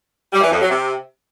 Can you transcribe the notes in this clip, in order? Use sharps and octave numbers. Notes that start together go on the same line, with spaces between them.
G3
E3
F2
F#3
C3